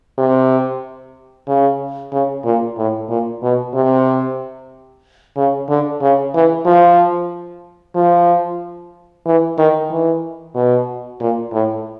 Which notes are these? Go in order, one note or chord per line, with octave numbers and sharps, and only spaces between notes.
C3
C#3
C#3
A#2
A2
A#2
B2
C3
C#3
D3
C#3
E3
F3
F3
E3
D#3
E3
B2
A#2
A2